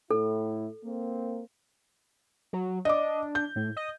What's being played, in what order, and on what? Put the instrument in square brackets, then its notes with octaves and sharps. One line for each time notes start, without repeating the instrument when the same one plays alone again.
[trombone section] A2 E4 [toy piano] A4
[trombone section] A#3 C4
[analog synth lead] F#3
[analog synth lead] D4 [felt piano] D#5 D6
[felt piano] G6
[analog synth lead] A2
D#5